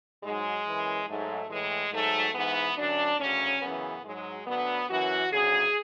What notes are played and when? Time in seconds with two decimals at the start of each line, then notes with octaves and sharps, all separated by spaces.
0.23 G#2 F#3 G#3
0.65 F#2 E3
1.07 G#2 F#3 A3
1.49 A2 E3 G#3
1.92 G#2 F#3 A3
2.34 G#2 E3 B3
2.77 F#2 D3 F#3 D4
3.19 D2 C#3 F#3 C#4
3.62 F#2 C#3 E3 B3
4.04 G#2 F#3 G#3
4.46 D2 D3 F#3 B3
4.89 F#2 E3 F#4
5.31 D2 C#3 F#3 G#4